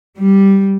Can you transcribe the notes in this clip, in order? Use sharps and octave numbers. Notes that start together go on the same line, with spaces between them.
G3